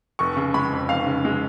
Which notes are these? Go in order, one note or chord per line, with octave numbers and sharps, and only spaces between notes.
F1 C#6
C#3
G#3 B5
F2
F1 F5
C#3
G#3